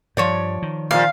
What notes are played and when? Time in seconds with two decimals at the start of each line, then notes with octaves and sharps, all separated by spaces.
0.17 G2 F3 C#5 D5
0.62 D#3
0.91 A#2 F3 F5